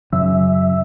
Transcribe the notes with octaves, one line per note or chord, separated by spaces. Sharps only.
F#2 C#3 E5